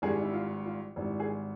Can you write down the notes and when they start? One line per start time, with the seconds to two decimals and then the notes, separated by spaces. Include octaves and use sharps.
0.02 G#1 G2 E3 G#4
0.22 E4
0.34 F4
0.65 F4
0.96 G#1 G2 E3
1.20 G#4